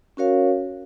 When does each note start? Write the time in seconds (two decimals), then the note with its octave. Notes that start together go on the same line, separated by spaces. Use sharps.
0.17 C#4 F#4 A#4 C#5 F5